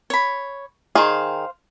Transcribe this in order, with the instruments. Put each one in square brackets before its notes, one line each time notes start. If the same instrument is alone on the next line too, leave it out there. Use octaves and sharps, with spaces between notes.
[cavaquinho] C#5 B5
[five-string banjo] D#3 G#4 [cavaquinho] C5 F5